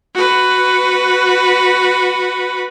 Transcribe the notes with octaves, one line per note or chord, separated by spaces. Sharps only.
F#4 B4